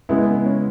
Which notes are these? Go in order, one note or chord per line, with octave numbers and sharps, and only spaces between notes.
C#3 G#3 B3 E4
B3
B3
C#4